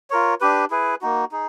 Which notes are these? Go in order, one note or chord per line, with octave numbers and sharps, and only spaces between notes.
F4 A#4 C#5
D4 G4 B4
E4 G#4 B4
A#3 D#4 F#4
D#4 G#4